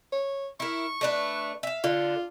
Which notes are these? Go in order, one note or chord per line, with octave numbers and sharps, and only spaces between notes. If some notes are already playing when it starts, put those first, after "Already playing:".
C#5
E4 A#4 C#6
A3 D4 B4
E5 F5
D3 F4